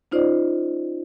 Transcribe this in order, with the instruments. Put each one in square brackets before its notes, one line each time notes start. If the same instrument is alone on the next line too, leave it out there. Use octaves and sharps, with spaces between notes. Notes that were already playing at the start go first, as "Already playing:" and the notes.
[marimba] C#4 D#4 F4 C5 D5 D#5